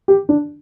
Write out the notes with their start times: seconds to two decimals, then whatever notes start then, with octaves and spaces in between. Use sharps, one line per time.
0.08 G4
0.29 D4